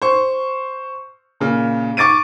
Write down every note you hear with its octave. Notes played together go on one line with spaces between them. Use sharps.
C5 C#6
A#2 C#3
C#6 D6 A6 D7 D#7